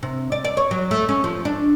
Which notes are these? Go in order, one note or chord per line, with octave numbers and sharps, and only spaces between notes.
C3
D5
D5
C#5
F#3
A3
C#4
F3
D4